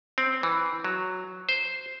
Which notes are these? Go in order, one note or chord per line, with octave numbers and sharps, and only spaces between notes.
C4
E3
F#3
C5